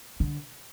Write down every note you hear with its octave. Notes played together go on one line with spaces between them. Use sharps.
D3